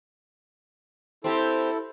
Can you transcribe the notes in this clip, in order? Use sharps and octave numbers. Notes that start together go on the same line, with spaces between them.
C4 E4 G4 A4